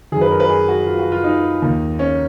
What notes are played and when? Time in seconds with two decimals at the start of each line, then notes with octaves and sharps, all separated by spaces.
0.12 D#3 G#4
0.16 F#2
0.21 B4
0.31 A#4
0.40 B4
0.49 G#4
0.68 F#4
0.87 F4
0.99 F#4
1.12 F4
1.24 D#4
1.62 D#2 D#3
1.99 C#4